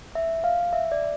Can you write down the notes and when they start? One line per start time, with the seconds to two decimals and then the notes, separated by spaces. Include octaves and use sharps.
0.15 E5
0.44 F5
0.73 E5
0.92 D5